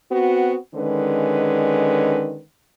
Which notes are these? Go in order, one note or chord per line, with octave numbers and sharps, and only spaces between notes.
B3 C4 F#4
D3 D#3 G#3 C#4 B4